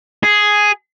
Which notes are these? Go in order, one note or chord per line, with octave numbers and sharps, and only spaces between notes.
G#4